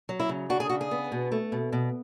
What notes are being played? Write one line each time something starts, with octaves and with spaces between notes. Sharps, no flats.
F#3
E4
C#3
D4 F#4
G#4
C#3 F#4
G#4
B3
B2
A3
B2
B2